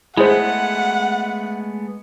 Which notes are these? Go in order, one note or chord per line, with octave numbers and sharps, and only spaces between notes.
G#3 A3 B3 E4 G#4 C5 F#5